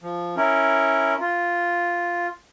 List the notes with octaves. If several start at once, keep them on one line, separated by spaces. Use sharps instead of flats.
F3
C#4 E4 A#4
F4